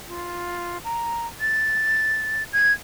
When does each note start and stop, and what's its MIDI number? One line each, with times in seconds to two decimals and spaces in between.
0.08 0.78 65
0.84 1.26 82
1.40 2.44 93
2.53 2.72 92